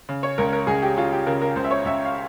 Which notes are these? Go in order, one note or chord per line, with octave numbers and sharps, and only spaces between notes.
C#3
C#5
C#2 A#4
A#4
C#2 G#4
G4
C#3 F4
G4
C#3 A#4
A#4
C#2 C5
E5
C#5
C#2 E5
F5